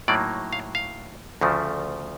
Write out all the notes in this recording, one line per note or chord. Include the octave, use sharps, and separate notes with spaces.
A2 F#3 A#3 D#4 D5
F5
F5
D2 C#3 F3 A3